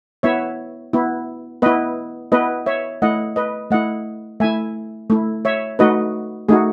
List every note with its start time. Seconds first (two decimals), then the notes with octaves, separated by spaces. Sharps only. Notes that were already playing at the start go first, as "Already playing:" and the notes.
0.23 B3 E4 C#5 E5
0.93 B3 E4
1.62 B3 E4 B4 D#5
2.32 B3 E4 B4 D#5
2.66 C#5 E5
3.02 A3 E4 D#5 F#5
3.36 B4 D#5
3.71 A3 E4 D#5 F#5
4.40 A3 E4 E5 G#5
5.10 A3 E4
5.45 C#5 E5
5.79 A3 D#4 F#4 B4 D#5
6.49 A3 D#4 F#4 G#4